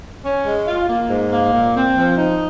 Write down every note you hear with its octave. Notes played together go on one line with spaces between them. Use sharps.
C#4
G#3
F4
A#3
G#2
A#3
A#2
C4
F3
D#4